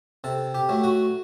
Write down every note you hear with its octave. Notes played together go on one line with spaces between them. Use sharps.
C3 A4
G4
F#3 A3
F#4